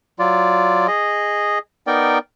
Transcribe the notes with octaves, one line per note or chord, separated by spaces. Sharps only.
F#3 F4 D5
G#4 D#5
B3 D#4 A#4 D5 G5